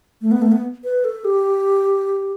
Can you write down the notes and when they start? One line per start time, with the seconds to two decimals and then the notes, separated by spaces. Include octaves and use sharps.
0.21 A3
0.31 B3
0.42 A3
0.52 B3
0.84 B4
1.04 A4
1.25 G4